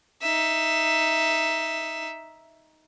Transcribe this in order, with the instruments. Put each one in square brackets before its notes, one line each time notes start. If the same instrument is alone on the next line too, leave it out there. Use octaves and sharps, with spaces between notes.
[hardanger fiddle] D#4 E5